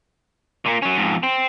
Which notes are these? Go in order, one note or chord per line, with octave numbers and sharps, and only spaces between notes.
A#2 A#3
F#3 C#4
F2 G#2
C4